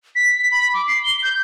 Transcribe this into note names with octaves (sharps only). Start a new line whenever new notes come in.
B6
B6
B5
D6
C7
G7
G6